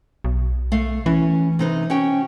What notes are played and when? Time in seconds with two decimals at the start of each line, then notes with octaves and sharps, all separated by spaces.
0.24 B1
0.72 A3 F5
1.06 E3 C#4
1.59 C3 D#4 B4
1.90 C#4 F#4 G5